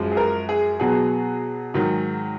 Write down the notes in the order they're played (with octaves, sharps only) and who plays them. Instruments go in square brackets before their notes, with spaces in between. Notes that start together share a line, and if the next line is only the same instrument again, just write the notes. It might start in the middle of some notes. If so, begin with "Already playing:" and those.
Already playing: [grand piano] F#2 F3 G#3
G#4
A#4
G#4
B2 F#3 B3 G#4
G#2 D#3 F#3